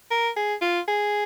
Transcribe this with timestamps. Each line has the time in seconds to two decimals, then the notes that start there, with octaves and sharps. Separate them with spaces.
0.11 A#4
0.36 G#4
0.62 F4
0.88 G#4